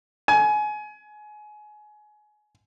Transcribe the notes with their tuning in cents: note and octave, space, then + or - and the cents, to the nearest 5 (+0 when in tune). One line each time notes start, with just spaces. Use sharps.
G#5 +25